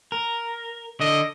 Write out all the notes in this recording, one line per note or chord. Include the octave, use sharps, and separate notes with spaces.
A#4
D3 D#5